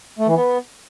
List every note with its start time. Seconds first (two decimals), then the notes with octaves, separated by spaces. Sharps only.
0.19 A3
0.28 E3
0.36 B3